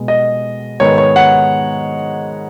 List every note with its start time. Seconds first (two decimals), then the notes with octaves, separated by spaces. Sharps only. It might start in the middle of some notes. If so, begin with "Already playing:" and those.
Already playing: B2 G#3 B3
0.08 D#5
0.80 G#2 D#3 G#3 B3 C#5
0.98 C#5
1.16 F#5